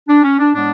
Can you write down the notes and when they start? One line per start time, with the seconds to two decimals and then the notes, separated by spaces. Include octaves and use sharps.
0.09 D4
0.23 C#4
0.40 D4
0.54 A2 G#3 B3 D4